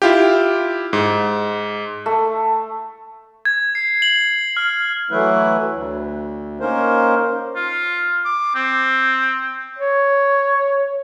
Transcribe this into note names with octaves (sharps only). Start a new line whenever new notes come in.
E4 F4 G4
G#2
A3
G#6
C7
F#7
F6
E3 F#3 A3 E4 B4
D2
A#3 C#4 D#4 A#4 C5
F4
D6
C4
C#5